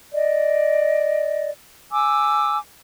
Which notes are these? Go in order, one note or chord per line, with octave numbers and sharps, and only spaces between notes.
D5 D#5
G#5 D6 E6